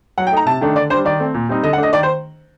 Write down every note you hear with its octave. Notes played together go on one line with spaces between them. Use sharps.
F#3 F#5
G5
A3 D#4 A#5
C3 A5
D#3 A3 D4
D3 D5
G3 D4 C5
D#3 D5
A3 C4
A#2
G3 C4 D#4
D3 D#5
F#5
A3 D4 D#5
D#3 D5
C5